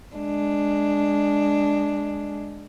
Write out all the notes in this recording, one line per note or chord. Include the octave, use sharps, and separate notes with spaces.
G#3 D4